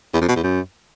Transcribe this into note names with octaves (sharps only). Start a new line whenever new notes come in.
E2
F2
B2
E2
F#2